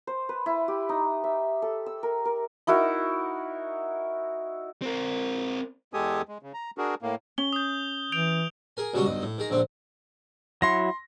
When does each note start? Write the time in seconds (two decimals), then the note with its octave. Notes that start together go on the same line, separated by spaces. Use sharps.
0.07 C5
0.29 B4
0.46 E4
0.68 G4
0.89 D#4
1.24 E5
1.62 A4
1.86 E6
2.03 A#4
2.25 A#4
2.67 D#4 E4 F#4 A#4
4.82 C4 A#4
5.94 E2 G#3 G4 A4 G#5 D#6
6.28 G#3
6.43 C#3
6.54 A#5
6.78 D4 F#4 G#4 A#4
7.02 A2 A#3
7.38 C#4 G7
7.53 D#6 G6
8.12 E3 G6 D7 F7
8.77 G#4 A#4 G#5
8.94 C#2 B2 F#3 G3 C#6 D#6
9.06 B1 G2 D#5
9.22 A2
9.38 D#3 G#4 A#5
9.50 A#1 D3 C4
10.62 F#3 E4 F#4 C6 A#6